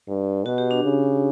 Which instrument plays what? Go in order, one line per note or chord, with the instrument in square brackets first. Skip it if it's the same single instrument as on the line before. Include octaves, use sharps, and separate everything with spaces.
[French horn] G2
[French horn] B2 [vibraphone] F#4
[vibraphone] G4
D4
[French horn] C#3